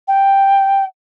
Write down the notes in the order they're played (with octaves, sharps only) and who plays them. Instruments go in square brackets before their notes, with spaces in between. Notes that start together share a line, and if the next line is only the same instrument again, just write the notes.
[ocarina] G5